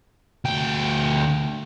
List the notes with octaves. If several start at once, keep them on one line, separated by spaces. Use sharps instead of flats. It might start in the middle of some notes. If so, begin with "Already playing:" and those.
D2 G5